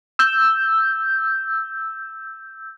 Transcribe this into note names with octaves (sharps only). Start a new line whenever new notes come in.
E6 G6